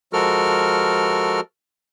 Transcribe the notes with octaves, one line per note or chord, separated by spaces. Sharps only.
F3 G#3 F#4 A4 A#4 F6